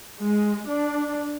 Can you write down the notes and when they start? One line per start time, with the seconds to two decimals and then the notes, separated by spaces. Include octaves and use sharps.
0.20 G#3
0.68 D4